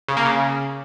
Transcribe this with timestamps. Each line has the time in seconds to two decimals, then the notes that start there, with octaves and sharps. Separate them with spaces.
0.08 C#3
0.17 A#3
0.25 C#3